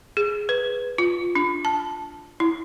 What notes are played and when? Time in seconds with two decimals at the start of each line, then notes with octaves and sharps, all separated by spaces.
0.17 G#4
0.49 B4
0.98 F4
1.35 D4
1.65 A5
2.40 E4